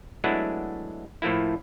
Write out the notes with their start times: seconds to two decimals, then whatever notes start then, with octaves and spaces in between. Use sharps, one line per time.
0.24 F#3 G#3 A3 B3 D4 E4
1.22 A2 F3 A3 A#3 E4